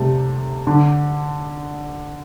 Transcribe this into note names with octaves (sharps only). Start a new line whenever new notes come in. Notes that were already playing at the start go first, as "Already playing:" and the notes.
Already playing: C3 G3 A3
D3